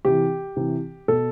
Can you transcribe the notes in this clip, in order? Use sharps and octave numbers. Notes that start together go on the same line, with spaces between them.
C3 E3 G4
C3 E3
B2 A4